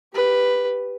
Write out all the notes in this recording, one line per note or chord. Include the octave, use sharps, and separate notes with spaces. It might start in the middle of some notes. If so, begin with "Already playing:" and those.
G4 B4